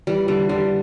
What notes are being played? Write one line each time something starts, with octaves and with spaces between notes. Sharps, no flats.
E3 G3
D3 G3
D3 G3